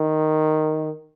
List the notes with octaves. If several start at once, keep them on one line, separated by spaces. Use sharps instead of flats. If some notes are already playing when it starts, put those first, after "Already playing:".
Already playing: D#3